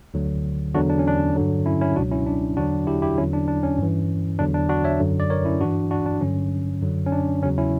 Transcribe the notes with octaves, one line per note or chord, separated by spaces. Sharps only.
D2 D3 F#3
E2 D3 F#3 D4 F#4
D4
C#4
D4
G2 D3 F#3
C#4 E4
C#4 E4
C#2 B2 F#3 D4 F#4
C#4 E4
D4
E2 D3 F#3 D4 F#4
E4 G4
E4 G4
E2 D3 F#3 C#4 E4
D4
D4
C#4
G2 E3
E2 D3 F#3 D4
D4
D4 F#4
C#5 E5
F#2 D3 F#3
D5
A#4 C#5
C#4 E4
G2 E3 D4 F#4
D4 F#4
D4
G2 D3 F#3 C#4
F#2 D3 F#3
C#4
D4
E2 C#3 F#3 C#4
C#4 E4